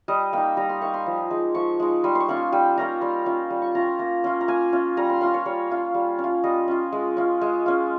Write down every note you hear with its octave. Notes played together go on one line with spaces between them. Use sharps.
G3 D#5
A#3 D#4 G5
G3 A#5
C6
A#3 D#4 C#6
C6
F3
G#3 D#4
F3 C#6
G#3 D#4
G3 C6
C6 C#6
A#3 C#4 F4
C6
G3 G5
A#3 C#4 F4 A#5
G3 C6
C#4 F4
G3
C#6
C#4 F4 A#5
C6
A#3 A#5
C#4 F4
A#5
A#3 G#5
C#4 F4
G3 A#5
C6
C#4 F4 C6
C#5
G3 C#5
C#4 F4
G3
C#4
F4
G3 D#5
C#4 F4
G#3
C#4 F4
G#3
C#4 F4